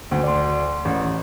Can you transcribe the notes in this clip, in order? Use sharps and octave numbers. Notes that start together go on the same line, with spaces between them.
D2
D5 C6
A1